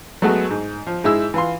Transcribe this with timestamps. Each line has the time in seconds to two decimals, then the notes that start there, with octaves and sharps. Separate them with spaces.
0.22 F#3 G#3 A3 B3 F#4
0.51 G#2
0.87 F3
1.04 G#2 G#3 E4 E6
1.34 E3 F4 C6